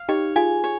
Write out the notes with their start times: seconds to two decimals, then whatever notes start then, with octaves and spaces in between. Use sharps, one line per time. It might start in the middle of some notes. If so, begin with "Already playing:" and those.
Already playing: F5
0.09 D#4 G4 C#5
0.36 F4 G#4 G#5
0.64 C#5